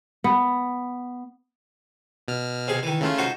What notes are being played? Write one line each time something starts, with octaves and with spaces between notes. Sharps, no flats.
B3
B2 F6
C3 G#4
D#3 E3
C#3 A3 F4
D#4 F#4 C5